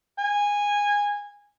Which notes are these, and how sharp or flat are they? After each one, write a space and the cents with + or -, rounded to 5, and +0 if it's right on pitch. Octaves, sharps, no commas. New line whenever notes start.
G#5 -15